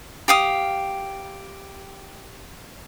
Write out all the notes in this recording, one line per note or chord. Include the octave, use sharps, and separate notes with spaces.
G4 F5 D#6